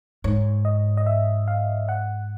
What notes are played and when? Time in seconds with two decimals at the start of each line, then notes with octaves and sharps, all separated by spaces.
0.24 G#2 C#5
0.65 D#5
0.97 D#5
1.06 E5
1.48 F5
1.89 F#5